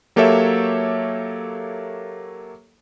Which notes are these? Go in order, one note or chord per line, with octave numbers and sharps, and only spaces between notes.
F#3 A#3 G4 A4 C#5 E5